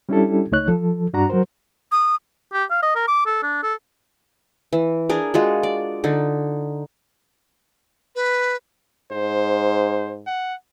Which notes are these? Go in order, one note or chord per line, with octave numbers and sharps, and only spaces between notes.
G3 C#4 D4 E4 G4 A4
C#2 A3 D#4 C#5 F#6
F3 A4
G2 D4 F#4 A#5
F#3 F#4 A#4 C5
D#6
G4
F5
D#5
A#4
D6
A4
D4
A4
E3
D4 G#4 A#4
G#3 F4 F#4
D5
D3 D#4
B4
G#2 C5
F#5